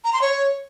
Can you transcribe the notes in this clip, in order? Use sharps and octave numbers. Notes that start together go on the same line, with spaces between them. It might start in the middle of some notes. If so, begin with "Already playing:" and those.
A#5
C6
C#5